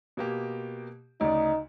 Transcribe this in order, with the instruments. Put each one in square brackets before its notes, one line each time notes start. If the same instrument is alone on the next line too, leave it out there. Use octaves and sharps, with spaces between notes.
[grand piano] B2 A#3 G4
[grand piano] D2 C#3 D5 [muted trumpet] D#4